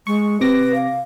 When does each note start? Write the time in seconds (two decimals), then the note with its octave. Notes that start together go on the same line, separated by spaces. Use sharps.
0.07 G#3 C#6
0.41 C3 B4 D6 A#6
0.74 F5